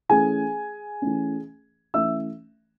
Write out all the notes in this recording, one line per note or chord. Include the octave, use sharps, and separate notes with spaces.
E3 A3 C#4 G#4 G#5
E3 A3 C#4
E3 A3 C#4 E5 E6